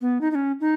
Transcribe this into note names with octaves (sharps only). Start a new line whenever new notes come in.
B3
D#4
D#4
C#4
D#4